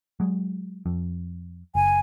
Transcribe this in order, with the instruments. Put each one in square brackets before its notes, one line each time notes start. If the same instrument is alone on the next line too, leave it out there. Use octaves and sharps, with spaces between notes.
[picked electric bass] F#3 G#3
F2
[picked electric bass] F#1 [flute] G#5